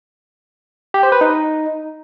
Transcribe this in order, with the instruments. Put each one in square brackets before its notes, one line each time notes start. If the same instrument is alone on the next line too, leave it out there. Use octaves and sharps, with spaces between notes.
[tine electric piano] G4
C5
B4
D#4